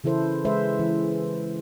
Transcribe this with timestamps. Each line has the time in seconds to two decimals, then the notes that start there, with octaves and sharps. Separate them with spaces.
0.04 C#3 E3 E4 A4 C5
0.45 G#3 B4 C5 E5
0.80 E3